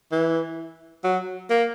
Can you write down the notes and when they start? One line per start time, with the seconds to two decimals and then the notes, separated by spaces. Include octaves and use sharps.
0.12 E3
1.04 F#3
1.50 A#3